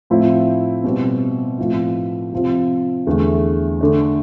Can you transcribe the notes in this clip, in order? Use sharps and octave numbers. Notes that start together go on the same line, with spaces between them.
A2 F3 C4 E4
B2 G3 C4
A2 F3 C4 E4
C3 F3 C4
E2 D3 A3
D3 A3 D4